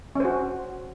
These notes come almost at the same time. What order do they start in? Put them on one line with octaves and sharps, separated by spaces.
C#4 C5 F#4